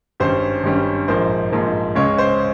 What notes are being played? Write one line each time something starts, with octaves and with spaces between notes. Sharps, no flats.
G#1 G2 G3 C#4 C5
G#1 G2 G3 C#4
A#1 G#2 F3 A#3 C5
A#1 G#2 F3 A#3
C#2 C#3 G#3 C#4 C#5
C5